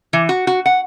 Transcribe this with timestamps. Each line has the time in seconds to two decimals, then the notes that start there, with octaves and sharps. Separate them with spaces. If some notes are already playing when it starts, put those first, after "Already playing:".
0.13 E3
0.29 F#4
0.47 F#4
0.66 F#5